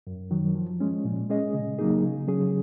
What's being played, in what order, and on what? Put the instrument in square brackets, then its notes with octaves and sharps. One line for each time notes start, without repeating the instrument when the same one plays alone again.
[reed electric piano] F#2
D#3 F#3
F3
G#3 C#4
A#2
G#3 C#4 G#4 D#5
C#3
F#3 A#3 D#4 G#4
C#3
F#3 C#4 G#4